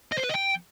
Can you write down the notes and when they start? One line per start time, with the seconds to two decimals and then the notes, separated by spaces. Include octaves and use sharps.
0.12 D#5
0.18 C5
0.23 B4
0.29 D#5
0.35 G5